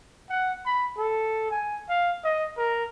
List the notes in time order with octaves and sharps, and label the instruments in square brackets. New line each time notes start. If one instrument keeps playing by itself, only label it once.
[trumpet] F#5
B5
A4
G#5
F5
D#5
A#4